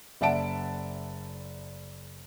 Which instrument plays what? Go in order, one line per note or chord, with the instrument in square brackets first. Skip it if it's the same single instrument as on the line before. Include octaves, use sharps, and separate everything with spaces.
[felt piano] F#1 D5 E5 F#5 A5 D7